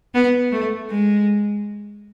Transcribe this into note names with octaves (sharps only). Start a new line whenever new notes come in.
B3
A3
G#3